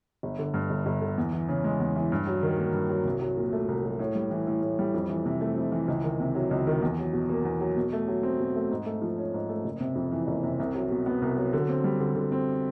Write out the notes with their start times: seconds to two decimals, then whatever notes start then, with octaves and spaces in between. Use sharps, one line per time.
0.23 G1
0.39 D3
0.54 G2
0.70 G1
0.86 G1
1.01 D3
1.18 E2
1.33 E3
1.49 C#3
1.64 G#3
1.80 E2
1.96 E3
2.12 G2
2.27 F#3
2.43 D#3
2.58 A#3
2.74 G2
2.89 F#3
3.05 C2
3.21 F#3
3.37 A#2
3.53 A3
3.68 C2
3.83 F#3
3.99 A2
4.15 G3
4.31 E3
4.47 A2
4.62 A2
4.79 G3
4.94 F2
5.09 E3
5.26 C3
5.41 A3
5.57 F2
5.72 E3
5.88 C#2
6.04 D#3
6.20 C3
6.35 F#3
6.51 C#2
6.67 D#3
6.82 E2
6.98 F#3
7.13 B2
7.29 A#3
7.45 E2
7.60 F#3
7.76 B2
7.93 A3
8.08 F#3
8.23 C4
8.39 B2
8.55 A3
8.71 G#2
8.86 A3
9.02 F3
9.18 C#4
9.34 G#2
9.49 A3
9.64 F#1
9.80 C3
9.96 F2
10.12 E3
10.27 F#1
10.43 C3
10.59 C2
10.74 F#3
10.91 B2
11.06 B3
11.22 C2
11.37 F#3
11.53 D3
11.69 C4
11.84 G3
12.00 D3
12.16 D3
12.32 C4